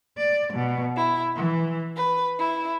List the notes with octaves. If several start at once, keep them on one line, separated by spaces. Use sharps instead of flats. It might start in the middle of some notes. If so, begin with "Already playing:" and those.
D5
B2
E4
E3
B4
E4